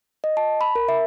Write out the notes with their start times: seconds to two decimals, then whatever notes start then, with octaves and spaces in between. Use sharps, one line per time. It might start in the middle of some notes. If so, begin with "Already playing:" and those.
0.24 D#5
0.37 A5
0.61 B5
0.75 A#4
0.89 E5